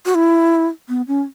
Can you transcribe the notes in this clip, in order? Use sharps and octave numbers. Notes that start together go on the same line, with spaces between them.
F#4
E4
B3
C#4